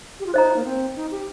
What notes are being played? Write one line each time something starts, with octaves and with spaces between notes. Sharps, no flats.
G4
F4
D#4 C5 D#5 A#5
A#3
C4
D#4
G4